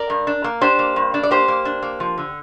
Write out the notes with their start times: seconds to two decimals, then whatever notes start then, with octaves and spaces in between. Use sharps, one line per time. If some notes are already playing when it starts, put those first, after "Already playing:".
Already playing: A#4 D5
0.10 G2
0.27 D4
0.44 A#3
0.61 D4 G4 C5
0.79 A#3
0.96 G2
1.14 D4
1.23 D5
1.31 A#3 G4 C5
1.48 A#3
1.65 D4
1.82 A#3
2.00 F3
2.18 D3